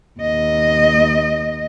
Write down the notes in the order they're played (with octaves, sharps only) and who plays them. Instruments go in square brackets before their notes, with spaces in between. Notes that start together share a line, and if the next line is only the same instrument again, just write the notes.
[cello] D#2 D#5